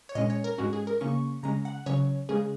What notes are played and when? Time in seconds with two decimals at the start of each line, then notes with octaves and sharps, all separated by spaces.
0.09 C#5
0.15 A#2 G#3 C#4 D#5
0.30 C#5
0.44 A#4
0.58 G#2 G#3 C#4 F#4
0.73 G#4
0.87 A#4
1.01 C#3 A#3 C#4 C#6
1.43 C#3 G#3 C#4 A#5
1.65 F#5
1.86 C#3 F#3 C#4 C#5
2.29 C#3 G#3 C#4 G#4